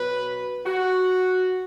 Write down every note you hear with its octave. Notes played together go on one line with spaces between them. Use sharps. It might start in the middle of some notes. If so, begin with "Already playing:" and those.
Already playing: B2 F#3 B4
F#4